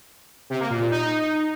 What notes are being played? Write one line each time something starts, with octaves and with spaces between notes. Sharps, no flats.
C3
A#3
A#2
A#2
D#4